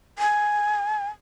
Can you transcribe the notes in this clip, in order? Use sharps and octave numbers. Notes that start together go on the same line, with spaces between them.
G#5